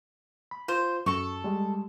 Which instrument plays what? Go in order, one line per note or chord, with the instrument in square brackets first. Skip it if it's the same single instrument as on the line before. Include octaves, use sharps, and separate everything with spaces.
[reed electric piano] B5
[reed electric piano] F4 [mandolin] C5
[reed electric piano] F#2 [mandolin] A4 C#6
[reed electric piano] G3 G#3